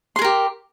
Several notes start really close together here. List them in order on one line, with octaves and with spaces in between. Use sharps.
C6 G#4 A#4 G4